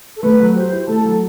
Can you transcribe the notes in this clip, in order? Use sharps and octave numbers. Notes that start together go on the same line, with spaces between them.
A4
A3 B4
F#3
G4 C5
E4
A3 A4 A5
F#3